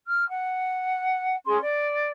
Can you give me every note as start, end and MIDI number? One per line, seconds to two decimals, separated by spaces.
0.06 0.27 89
0.30 1.35 78
1.45 1.58 61
1.45 1.58 68
1.45 1.58 84
1.60 2.10 74